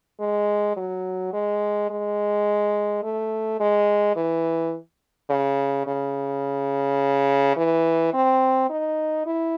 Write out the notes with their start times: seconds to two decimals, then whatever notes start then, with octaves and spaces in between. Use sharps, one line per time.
0.20 G#3
0.76 F#3
1.33 G#3
1.90 G#3
3.03 A3
3.60 G#3
4.16 E3
5.30 C#3
5.86 C#3
7.56 E3
8.13 C4
8.70 D#4
9.26 E4